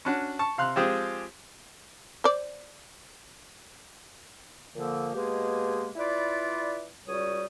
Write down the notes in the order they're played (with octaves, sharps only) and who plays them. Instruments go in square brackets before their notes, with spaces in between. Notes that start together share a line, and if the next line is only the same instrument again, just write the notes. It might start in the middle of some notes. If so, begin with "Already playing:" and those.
[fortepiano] C#4 D4 F#4
A5 C#6
C3 F5 C6 F#6
F3 G#3 C4 F4 G4 G#4
[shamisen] C5 D5
[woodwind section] A#2 D3 F3 A#3
B2 G#3 A#3 G4 G#4
E4 F4 B4 D5
C#2 G3 F#4 C#5 D#6